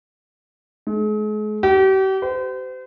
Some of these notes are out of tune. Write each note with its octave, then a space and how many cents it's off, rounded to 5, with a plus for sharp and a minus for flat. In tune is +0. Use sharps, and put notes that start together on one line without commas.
G#3 +40
G4 -40
C5 -40